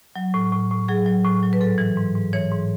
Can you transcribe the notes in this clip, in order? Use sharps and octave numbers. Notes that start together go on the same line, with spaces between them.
F#3
A2
A2
A2
F#3 G#4
F#3
A2
F#3
B4
G#2 A4
E3
G#2
G#2
E3 C#5
G#2